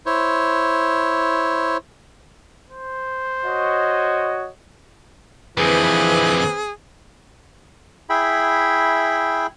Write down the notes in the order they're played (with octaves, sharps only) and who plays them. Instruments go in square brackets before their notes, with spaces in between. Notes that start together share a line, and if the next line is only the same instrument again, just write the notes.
[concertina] E4 C5 C#5
[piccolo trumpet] C5
[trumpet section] F#4 C#5 D#5
[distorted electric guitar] F2 D3 [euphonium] E3 [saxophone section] C4 B4 [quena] G#4
[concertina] E4 G#4 E5 G5 B5